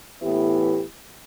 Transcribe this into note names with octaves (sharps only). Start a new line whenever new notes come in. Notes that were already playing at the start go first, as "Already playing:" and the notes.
A2 E3 B3 E4 G4